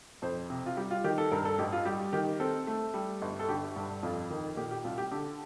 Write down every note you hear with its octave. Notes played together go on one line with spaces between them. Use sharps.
F2 C5
C3
F4
G3 G4
F4
D#3 G4
A4
G2 A#4
A4
A1 G4
F4
G3 G4
D#3 G4
C4 A4
A3
G3
G1
A4
D3 G4
G2
F2 F4
D#3
A#2 G4
G4
C2 F4
G4
D3 G4